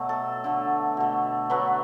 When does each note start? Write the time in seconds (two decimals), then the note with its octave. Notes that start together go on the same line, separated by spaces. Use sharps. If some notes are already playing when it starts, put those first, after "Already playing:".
Already playing: B2 F#3 A3
0.09 A4
0.44 D3 A3
0.97 B2 A3
1.50 D3 F#3 A3 B4